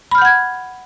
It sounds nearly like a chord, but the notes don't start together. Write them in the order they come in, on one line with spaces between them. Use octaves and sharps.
B5 F6 G6 F#5 G#6